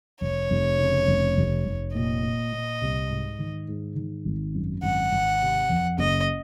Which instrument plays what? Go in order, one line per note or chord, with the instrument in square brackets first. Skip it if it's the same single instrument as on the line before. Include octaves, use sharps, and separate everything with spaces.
[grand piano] F1 [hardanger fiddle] C#5
[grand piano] F1
C#3
F1
F1
F1
[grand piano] A#2 [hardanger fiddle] D#5
[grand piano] A#2
A#2
C2
G#2
D#3
G#2
D#3
G#1
F#2
[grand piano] G#1 [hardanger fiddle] F#5
[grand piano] G#1
C3
F2
[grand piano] F#1 [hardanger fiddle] D#5